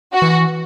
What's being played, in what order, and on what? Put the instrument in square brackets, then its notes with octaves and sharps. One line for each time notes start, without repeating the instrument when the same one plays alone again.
[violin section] F#4
[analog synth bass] E3